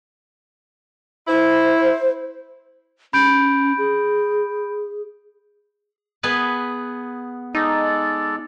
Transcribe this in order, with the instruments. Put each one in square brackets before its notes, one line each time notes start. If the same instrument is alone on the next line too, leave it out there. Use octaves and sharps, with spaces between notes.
[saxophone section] E4 [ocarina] C5
[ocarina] C#4 [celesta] B5 G6 D7
[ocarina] G#4
[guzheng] B3 G#4 B4
[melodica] G#3 A4 D5 [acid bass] D#4